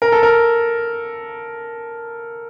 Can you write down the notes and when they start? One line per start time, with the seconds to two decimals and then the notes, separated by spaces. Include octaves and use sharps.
0.02 A#4
0.12 A4
0.23 A#4